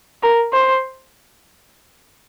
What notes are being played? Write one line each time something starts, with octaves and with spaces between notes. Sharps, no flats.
A#4
C5